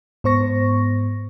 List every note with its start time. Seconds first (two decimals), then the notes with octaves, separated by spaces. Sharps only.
0.24 G#2 B3 C5 C#6 A#6